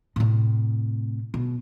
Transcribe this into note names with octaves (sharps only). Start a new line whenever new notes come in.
A2 C3
B2